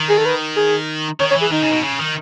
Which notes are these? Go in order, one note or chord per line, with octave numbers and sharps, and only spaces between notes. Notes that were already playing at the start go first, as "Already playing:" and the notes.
Already playing: D#3
G#4
A4
B4
G#4
D#3 C#5
C#5
E3
G#4
D#3 D#4
C#3
B2
C#3
D#3